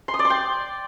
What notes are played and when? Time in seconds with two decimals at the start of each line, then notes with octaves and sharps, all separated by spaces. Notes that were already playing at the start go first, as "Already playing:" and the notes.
0.08 C6
0.14 D#6
0.19 D5
0.25 C6
0.30 G5